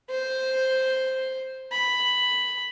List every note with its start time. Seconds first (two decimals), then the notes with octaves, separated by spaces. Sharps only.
0.10 C5
1.72 B5